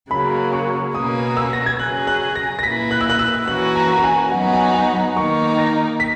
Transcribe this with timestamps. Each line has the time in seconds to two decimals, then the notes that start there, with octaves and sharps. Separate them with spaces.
0.10 C#3 F#3 A#3 B5
0.53 C#6
0.94 B2 A#3 C#4 F#4 B4 D#6
1.37 E6
1.53 A#6
1.66 G#6
1.79 C#3 F#3 C#4 G#4 F#6
2.07 F#6
2.35 A#6
2.59 A#6
2.63 A#2 A#3 E4 B4 B6
2.91 F#6
3.01 E6
3.09 F#6
3.19 E6
3.47 E3 A#3 C#4 F#4 B4 F#6
3.75 A#5
3.98 A#5
4.04 G#5
4.32 F#3 B3 D#4 F#4 F#5
4.53 G#5
4.74 G#5
4.95 A#5
5.16 D#3 A#3 D#4 A#4 C#6
5.58 A#6
6.00 B6